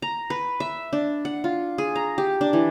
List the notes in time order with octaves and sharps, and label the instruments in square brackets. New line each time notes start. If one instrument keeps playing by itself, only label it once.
[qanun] A#5
B4
E5
D4
F#5
F4
G#4
A#5
G4
D4
E3